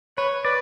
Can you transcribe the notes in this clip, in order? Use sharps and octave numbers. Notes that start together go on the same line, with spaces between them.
B4 C#5
B4 D5